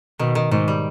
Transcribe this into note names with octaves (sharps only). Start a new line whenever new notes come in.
B2 D#3
D#3
G#2 D#3
G3